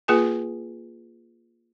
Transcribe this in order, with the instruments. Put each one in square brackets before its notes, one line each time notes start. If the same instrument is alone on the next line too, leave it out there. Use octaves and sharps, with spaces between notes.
[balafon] A#3 F4 G#4 B4 G#5